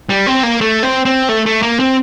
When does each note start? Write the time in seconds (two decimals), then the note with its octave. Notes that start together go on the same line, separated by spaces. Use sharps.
0.09 G3
0.27 C4
0.43 A#3
0.61 A3
0.83 C4
1.05 C4
1.29 A3
1.46 A3
1.62 A#3
1.80 C4